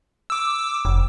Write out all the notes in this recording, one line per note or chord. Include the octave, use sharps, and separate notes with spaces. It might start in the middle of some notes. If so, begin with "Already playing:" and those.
D6 E6
F1